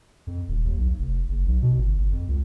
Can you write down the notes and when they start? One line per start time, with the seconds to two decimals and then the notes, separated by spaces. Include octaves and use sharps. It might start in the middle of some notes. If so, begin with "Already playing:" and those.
0.27 F2
0.48 D#1
0.64 D#2
0.77 B1
0.98 F1
1.28 F#1
1.46 B1
1.62 B2
1.78 G1
1.98 G1
2.12 F2
2.28 C#2